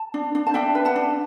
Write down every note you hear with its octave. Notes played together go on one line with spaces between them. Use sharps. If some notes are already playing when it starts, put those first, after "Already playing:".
Already playing: A5
D4
D4
A5
D4 E5 G5
B4
F#5 A5
D4